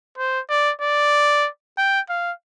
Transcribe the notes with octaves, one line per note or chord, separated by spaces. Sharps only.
C5
D5
D5
G5
F5